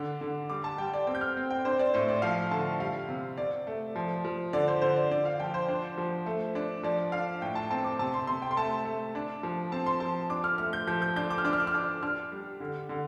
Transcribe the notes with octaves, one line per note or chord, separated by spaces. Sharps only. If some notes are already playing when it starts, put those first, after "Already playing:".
Already playing: D3 D4
D3
G3 D6
A5
G3 G5
D5
C4 G5
G6
F6
C4
G5
D4 C5
D5
A2 C5
D5
F3 F5
D3 A5
G3 F5
C3
C3 D5
A3
F3
F3
D3 D5
C5
D3 C5
D5
D3 D5
F5
F3 G5
C5
D4
F3
A3
D4
F3 D5
D4 F5
A2 G5
A5
C4 A5
D6
C3 A5
C6
C3 C6
G5
C6
A3 A5
A3
D4
F3
C4 A5
C6
F3 A5
D4 D6
F6
A3 F6
G6
F3 G6
G6
D4 G6
D6
F6
D4 D6
F6
D6
F6
D4 D6
D4 F6
G3
D3
D3